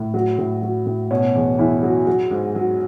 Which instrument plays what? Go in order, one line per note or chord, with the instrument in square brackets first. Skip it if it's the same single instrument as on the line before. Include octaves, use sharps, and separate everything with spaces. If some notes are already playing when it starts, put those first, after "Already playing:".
Already playing: [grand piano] A2
F#3
A2
F#3
A2
B2 C#4
E2
E2 E4
F#3
F#3
G#2
F#3